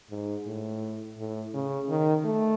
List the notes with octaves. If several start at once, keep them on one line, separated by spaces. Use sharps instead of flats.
G#2
A2
A2
C#3
D#3
A3